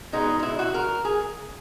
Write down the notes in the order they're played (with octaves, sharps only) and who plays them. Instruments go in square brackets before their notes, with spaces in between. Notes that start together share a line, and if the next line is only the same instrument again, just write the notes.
[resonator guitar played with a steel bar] B2 G#3 B3 D#4
D#4
E4
F#4
A#4
G#4